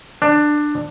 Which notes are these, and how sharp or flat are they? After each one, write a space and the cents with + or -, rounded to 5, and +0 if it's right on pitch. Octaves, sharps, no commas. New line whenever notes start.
D4 +15